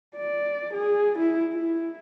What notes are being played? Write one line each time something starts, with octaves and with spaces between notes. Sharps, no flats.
D5
G#4
E4
E4